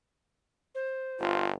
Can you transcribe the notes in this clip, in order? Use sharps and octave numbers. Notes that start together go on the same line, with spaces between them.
C5
G1 F4